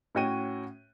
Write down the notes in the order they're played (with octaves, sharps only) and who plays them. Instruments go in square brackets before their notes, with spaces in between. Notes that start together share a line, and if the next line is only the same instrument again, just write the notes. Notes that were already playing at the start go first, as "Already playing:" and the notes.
[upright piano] A2 C#4 F#4 G5 D#7